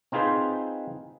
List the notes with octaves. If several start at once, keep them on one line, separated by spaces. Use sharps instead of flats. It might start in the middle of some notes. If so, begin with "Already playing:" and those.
C4 D#4 F4 G#4 B4 C5